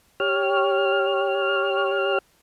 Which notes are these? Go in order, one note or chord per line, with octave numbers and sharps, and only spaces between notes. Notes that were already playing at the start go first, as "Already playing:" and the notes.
G4 C#5 F6